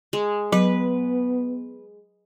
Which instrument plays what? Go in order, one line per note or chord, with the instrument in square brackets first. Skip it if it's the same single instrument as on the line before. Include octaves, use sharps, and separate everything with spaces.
[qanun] G#3
[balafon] F#3 [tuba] B3 [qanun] B4